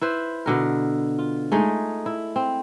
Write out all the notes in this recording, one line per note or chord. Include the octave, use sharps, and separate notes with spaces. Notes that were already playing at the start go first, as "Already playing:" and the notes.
E4 B4 C5
B2 D3 A#4
F4
G#3 A3 D#4
E4
C4